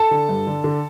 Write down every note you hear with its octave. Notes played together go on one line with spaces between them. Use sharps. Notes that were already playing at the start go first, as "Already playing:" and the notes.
Already playing: A4 A5
D3
G2
D3
D3